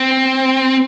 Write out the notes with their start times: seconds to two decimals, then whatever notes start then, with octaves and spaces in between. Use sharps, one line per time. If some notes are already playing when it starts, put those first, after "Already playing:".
Already playing: C4